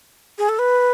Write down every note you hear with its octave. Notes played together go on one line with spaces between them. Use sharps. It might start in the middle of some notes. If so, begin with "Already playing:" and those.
G#4
A4
B4